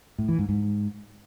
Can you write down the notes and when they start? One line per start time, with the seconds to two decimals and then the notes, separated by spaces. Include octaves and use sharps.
0.18 A2
0.29 E3
0.39 G#2
0.49 G#2